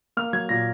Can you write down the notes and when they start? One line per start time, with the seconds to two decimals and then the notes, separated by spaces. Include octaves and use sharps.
0.17 A#3 F6
0.33 F#3 G#6
0.49 A#2 A#6